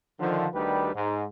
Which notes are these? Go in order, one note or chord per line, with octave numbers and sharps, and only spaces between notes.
D3 D#3 F3
D2 D3 D#3 G3 G4 B4
G#2